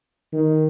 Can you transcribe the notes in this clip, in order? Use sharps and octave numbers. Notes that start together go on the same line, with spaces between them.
D#3